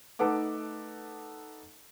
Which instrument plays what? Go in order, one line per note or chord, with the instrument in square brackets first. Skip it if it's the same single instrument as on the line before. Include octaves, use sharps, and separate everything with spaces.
[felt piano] A3 D#4 A4 B4 F#5 D6